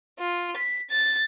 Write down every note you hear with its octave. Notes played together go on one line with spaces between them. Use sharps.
F4
B6
A6